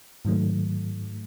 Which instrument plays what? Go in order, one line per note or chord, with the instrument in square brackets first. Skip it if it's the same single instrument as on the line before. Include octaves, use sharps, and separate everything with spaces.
[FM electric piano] G#2 D#3 F#3 A3